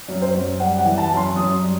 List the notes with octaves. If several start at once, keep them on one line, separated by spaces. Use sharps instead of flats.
F#2
C5
F#2
G3 F#5
F#5
E3
A5
F#2
C6
F#2 D#6
G3